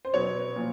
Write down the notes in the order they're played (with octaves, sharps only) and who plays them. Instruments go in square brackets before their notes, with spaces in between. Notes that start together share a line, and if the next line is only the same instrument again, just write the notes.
[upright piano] C5
B2 F#3 B3 C#5
A#2 F3